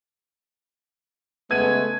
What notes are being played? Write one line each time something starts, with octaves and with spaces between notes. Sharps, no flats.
C#3 G#3 A3 B3 G#6 D#7